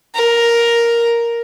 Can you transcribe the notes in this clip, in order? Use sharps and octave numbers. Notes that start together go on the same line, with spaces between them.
A#4